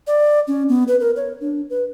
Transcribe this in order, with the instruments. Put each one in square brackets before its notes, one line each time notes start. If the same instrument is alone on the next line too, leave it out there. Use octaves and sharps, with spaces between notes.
[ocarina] D5
C#4
B3
B4
A#4
C#5
D4
B4